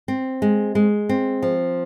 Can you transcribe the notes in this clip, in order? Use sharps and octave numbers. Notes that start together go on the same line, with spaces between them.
C4
G#3
G#3
C4
F3